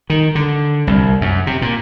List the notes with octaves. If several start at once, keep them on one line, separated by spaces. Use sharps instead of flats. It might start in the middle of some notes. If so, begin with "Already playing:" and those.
D#3
D3
C2
F#2
C3
A#2